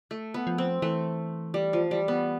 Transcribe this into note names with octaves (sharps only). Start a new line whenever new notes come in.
A3
B3
F3
C4
E3 A3
G3
F3
G3
B3